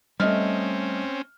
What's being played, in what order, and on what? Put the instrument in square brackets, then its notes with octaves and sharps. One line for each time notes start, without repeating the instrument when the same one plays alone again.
[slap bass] G3 [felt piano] A3 D#5 F6 [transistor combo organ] C4 C#4